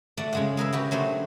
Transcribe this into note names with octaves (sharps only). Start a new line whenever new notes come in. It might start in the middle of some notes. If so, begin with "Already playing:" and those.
A3 D5 F#5
C#3 G#3 F#5
G#4 A#4 B4 E5
F#4 G4 B4
F#3 A3 D4 C5